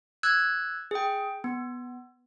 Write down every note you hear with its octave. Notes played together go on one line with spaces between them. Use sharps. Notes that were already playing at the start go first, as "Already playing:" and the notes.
E6 F#6 G#6
G#4 G5
B3